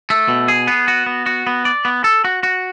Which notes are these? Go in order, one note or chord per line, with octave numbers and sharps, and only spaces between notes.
A3
B2
G#4
B3
F#4
B3
F#4
B3
D5
B3
A4
F#4
F#4